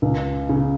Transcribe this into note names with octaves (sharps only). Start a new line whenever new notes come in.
C#2
C#3